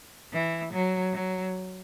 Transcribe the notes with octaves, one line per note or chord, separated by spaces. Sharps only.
E3
F#3
F#3